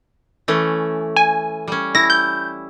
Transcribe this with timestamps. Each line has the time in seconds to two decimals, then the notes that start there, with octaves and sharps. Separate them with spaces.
0.48 E3 A3 C#4
1.16 G#5
1.68 G3 C#4
1.95 E4 A#6
2.10 G6